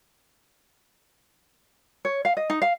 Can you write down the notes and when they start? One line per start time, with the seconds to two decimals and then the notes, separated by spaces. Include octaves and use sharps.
2.05 C#5
2.25 F5
2.37 D#5
2.50 D#4
2.62 F5